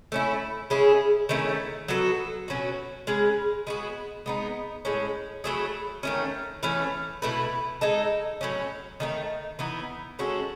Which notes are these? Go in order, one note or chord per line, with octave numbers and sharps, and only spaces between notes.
A3 C#4 E4
G#3 C#4 E4 G#4
D#3 A3 C#4 E4
F#3 B3 F#4 A4
B2 F#3 C#4 F#4
G#3 C#4 G#4 B4
G#3 B3 F#4
G#3 B3 D#4
A2 G#3 C#4
F#3 A3 E4 G#4
D#3 A3 C#4
E3 A3 C#4
B2 A3 E4 B4
G#3 D#4 A4
A2 F#3 C#4
D#3 A3 D#4
E3 B3 D#4
G#3 C#4 F#4 A4